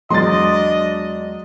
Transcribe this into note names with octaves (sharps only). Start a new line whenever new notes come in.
E2 F#3 G#3 D4 D#5 C6 A6